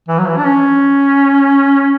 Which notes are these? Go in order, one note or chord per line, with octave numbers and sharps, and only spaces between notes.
E3
F#3
E3
D4
C#4